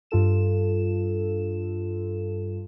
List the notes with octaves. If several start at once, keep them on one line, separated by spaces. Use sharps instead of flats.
G2 F4 A4 E7